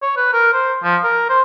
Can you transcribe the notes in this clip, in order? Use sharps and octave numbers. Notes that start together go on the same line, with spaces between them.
C#5
B4
A#4
C5
F3
A#4
C5